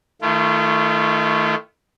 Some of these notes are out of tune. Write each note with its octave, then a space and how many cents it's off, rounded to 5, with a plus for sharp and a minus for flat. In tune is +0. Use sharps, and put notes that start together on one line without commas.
D#3 +15 A3 +0 F4 -40